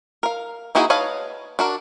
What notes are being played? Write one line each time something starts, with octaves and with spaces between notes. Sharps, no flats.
A#4 F5
A#3 D#4 E4 F#4 G#4
B4 C#5 D#5 F5 A5
D4 F#4 A#4